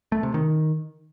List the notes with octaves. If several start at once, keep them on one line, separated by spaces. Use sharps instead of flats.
A3
C3
D#3